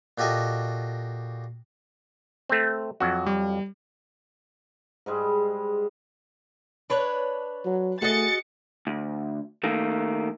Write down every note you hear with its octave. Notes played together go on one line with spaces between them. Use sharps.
A#2 F#4 G4 A4 D#5 C#6
A3 C4
F2 F#3 F#4
G3
G#2 G3 G#3 B5
D4 B4 C#5
F#3
A3 F#4 G#4 D#5 A6 C#7
D2
D#3 A3 A#3